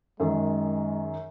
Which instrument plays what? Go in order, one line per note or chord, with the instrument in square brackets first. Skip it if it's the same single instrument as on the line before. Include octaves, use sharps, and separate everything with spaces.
[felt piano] F#2 D#3 [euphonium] G#3